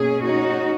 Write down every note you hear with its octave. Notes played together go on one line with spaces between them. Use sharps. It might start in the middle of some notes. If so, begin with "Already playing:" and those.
Already playing: B2 A#3 C#4 G#4
D#4 F#4